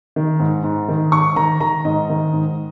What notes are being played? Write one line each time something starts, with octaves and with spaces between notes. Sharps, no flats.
D#3
G#2
G#2
D#3
G#2 C#6
D#3 A#5
D#3 A#5
G#2 D#5
D#3
G#2